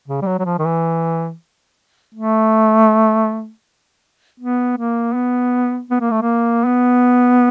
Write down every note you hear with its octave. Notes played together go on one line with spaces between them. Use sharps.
C#3
G3
F#3
F#3
F3
D#3
E3
A3
B3
A#3
B3
B3
A#3
A3
A#3
B3